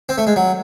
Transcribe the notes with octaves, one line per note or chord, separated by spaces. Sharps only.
C4
A3
G#3
F#3